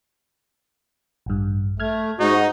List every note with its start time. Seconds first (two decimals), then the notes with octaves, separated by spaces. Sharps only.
1.26 A1 G2
1.80 A3 F6 G#6
2.20 G#2 D#4 F#4